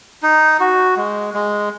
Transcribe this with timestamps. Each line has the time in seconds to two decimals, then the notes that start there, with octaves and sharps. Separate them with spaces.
0.22 D#4
0.60 F#4
0.97 G#3
1.34 G#3